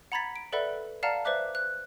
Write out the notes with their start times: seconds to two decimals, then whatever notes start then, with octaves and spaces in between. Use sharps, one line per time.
0.12 F#5 A#5 B5 G#6 A6 B6
0.36 D7
0.53 A4 B4 D5 E5 F#5 B5
1.03 D5 F5 F#5 A5 A#5 F6
1.25 B4 C5 D5 E5 D6 F#6
1.55 F#6